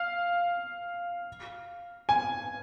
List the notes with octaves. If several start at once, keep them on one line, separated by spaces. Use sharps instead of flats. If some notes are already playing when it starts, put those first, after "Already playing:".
Already playing: F5
G#5